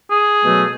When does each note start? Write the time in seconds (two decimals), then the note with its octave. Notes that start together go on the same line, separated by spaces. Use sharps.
0.11 G#4
0.42 B2 F#3 A3